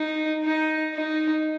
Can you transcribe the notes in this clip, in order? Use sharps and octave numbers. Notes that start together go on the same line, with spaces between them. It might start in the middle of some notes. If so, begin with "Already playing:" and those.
Already playing: D#4
D#4
D#4